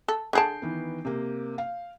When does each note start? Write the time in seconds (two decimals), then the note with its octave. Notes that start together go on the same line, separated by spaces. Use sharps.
0.08 A4
0.33 D3 G#4 A5 G6 C7 D7
0.62 D#3 E3 B3
1.05 C3 A#3
1.58 F5